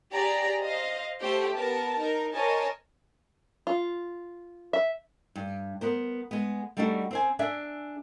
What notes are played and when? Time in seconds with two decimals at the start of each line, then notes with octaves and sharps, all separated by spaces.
0.12 G4 G#4 D5 A#5
0.61 C5 D#5 F5
1.21 A3 G4 C5
1.55 B3 A#4 A5
1.97 D#4 A#4
2.34 A#4 C5 C#5 D#5 G#5 A5
3.67 F4
4.73 E5
5.36 G2
5.81 B3 A#4 C5
6.31 G#3 B3
6.77 G3 A3 D4 D#4 F#4
7.11 C4 C5 G#5
7.39 D4 G#4 E5